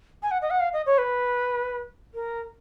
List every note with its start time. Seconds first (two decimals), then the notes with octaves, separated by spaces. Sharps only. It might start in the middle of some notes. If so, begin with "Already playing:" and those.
0.23 G#5
0.31 F#5
0.42 D#5
0.50 F#5
0.60 F5
0.73 D#5
0.86 C#5
0.98 B4
2.14 A#4